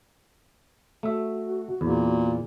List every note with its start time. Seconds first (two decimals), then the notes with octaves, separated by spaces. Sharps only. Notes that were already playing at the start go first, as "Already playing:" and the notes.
1.03 A3 F#4 E5
1.81 E2 A#2